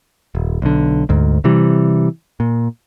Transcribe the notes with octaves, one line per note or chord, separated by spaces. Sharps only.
D#1
B1 D3
D2 G#2
C3 E3 G3
A#2